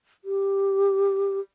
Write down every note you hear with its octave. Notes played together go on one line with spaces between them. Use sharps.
G4